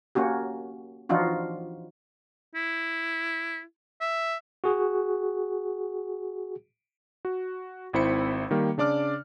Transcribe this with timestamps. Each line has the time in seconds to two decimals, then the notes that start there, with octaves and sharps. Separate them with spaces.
0.15 A#3 C#4 F#4 G4
1.09 E3 F3 D4 D#4 F4 F#4
2.55 E4
4.01 E5
4.64 F#4 G#4
7.25 F#4
7.93 G#1 C4 E4 C5 B5 C#7
8.51 D#3 G3 A#3
8.78 C#3 D4 D5 D6 F6